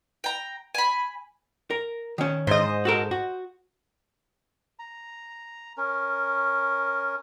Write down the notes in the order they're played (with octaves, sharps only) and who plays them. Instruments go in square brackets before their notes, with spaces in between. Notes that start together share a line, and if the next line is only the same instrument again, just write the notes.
[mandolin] G5 A#5
G#5 B5
[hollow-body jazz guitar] A#4
D#3 C#4
[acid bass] G#2 [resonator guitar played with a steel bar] C5 D#5
[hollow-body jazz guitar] F#4 A4 A#4
F#4
[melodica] A#5
C#4 A#4